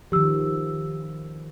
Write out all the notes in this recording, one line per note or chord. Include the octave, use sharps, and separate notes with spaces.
D#3 F3 G4 E6